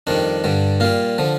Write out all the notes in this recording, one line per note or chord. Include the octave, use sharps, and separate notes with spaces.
F2 D#3 G3 D4
G2 D3 G3
A#2 G3 F4
D3 F3